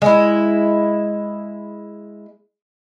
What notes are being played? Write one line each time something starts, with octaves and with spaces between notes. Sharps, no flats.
G#3 E4